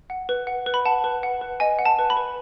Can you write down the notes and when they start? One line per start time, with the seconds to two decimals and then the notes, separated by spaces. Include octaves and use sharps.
0.10 F#5
0.29 B4
0.47 F#5
0.66 B4
0.74 B5
0.85 F#5 A5
1.04 B4
1.23 F#5
1.41 B4
1.60 D#5 G#5
1.79 F#5
1.85 A5
1.99 B4
2.10 B5
2.17 B4